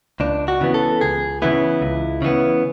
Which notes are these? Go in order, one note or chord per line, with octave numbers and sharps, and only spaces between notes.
C#2 D4
F#4
C#3 E3 B3
A4
C#2 G#4
C#3 E3 B3 E4
C#2
C#3 E3 B3